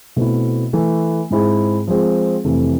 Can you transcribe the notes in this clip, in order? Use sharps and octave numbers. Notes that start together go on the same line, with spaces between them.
B2 A3 C4 E4
E3 A3 E4
G#2 G#3 C4 E4 G#4
F3 G#3 C4 G#4
F2 C3 E3 A3